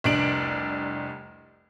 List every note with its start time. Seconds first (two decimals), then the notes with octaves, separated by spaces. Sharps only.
0.04 F1 C2 D4 D7 F#7